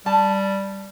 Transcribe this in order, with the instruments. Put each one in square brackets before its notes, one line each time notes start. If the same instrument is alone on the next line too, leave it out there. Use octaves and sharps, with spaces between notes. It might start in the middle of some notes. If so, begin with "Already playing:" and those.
[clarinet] G3 [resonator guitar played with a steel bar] A5